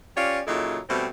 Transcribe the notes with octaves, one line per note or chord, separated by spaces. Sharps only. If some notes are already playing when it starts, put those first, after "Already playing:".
C#4 F4 G4 C#5 D5
A#2 C#3 F#3 D#4 E4 A4
B2 G3 A3 C4